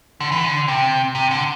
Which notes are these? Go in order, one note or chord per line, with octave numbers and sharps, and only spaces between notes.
D3
E3
D3
C3
C3
D3